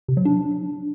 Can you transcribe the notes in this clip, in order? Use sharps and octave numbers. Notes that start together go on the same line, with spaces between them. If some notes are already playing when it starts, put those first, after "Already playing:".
C3
F#3
D4